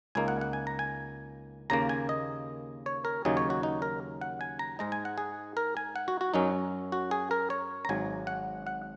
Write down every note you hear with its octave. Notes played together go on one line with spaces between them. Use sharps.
C#2 C#3 A#3 D#4 G#5
F#5
F#5
G#5
A#5
G#5
D#2 C#3 A#3 A#5
G#5
D#5
C#5
A#4
D#2 C#3 F#3 D#4 G#4
C#5
F#4
D#4
A#4
F#5
G#5
A#5
G#2 G#3 D#4 A#5
G#5
F#5
G#4
A#4
G#5
F#5
F#4
F#4
F#2 F#3 C#4 D#4
F#4
G#4
A#4
C#5
A#5
G#1 G#2 F#3 G#5
F#5
F#5